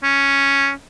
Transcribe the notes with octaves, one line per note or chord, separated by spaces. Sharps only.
C#4